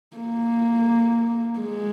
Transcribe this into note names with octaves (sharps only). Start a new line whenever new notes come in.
A#3
G#3